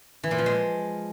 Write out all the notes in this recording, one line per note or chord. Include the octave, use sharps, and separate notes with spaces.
E3
A#2
F3
G#3